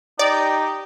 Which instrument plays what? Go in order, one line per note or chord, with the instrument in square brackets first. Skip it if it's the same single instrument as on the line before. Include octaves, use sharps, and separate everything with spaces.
[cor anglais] D#4 [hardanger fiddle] G4 [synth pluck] D5